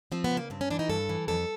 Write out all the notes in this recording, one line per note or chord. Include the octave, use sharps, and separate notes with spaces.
F3 C4
B3
C#3
A#3
G2 C4
C#4
E3 D4
D#4
G2 A4
E3
F2 A4